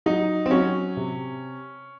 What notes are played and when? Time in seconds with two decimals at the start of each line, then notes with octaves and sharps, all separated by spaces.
0.06 F#3 D#4
0.46 C4
0.51 F#3 C#4
0.97 C3